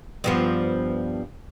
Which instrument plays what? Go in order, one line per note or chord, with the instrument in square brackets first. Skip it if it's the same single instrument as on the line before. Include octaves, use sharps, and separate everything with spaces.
[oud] G2 F3 B3